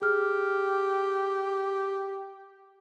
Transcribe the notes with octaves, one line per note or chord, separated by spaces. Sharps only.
G4 G#4 F6